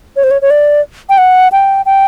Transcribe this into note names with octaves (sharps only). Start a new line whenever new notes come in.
C#5
C5
C#5
C#5
D5
G5
F#5
G5
G5